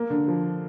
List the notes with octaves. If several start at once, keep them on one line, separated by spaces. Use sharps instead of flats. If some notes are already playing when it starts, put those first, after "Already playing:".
Already playing: A#3
D3
F3